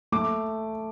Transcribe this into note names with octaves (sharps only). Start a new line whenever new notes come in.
A3 D6